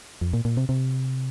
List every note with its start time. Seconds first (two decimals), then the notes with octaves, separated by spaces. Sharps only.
0.21 F2
0.33 A#2
0.45 A#2
0.57 C3
0.69 C3